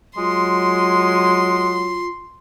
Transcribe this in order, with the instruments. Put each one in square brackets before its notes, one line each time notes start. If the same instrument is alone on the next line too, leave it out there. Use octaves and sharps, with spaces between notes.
[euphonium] F#3 [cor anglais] G#3 [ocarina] F4 [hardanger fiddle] C6